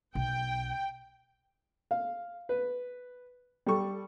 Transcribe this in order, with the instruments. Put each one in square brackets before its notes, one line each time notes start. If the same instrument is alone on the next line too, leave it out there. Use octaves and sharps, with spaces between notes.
[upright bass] B1 [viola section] G5
[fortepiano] F5
B4
G3 A4 C#6